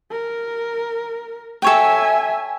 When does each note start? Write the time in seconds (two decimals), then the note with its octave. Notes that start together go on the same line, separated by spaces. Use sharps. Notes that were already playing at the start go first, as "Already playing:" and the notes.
0.11 A#4
1.62 A4 C#5 E5 G5 G#5